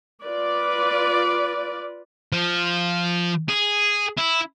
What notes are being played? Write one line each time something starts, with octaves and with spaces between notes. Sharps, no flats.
F4 B4 D5
F3
G#4
E4